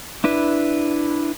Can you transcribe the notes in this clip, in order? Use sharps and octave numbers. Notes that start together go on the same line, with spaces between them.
D4 E4 B4